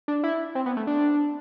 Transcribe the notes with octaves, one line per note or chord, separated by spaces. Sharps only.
D4
E4
C4
B3
A3
D4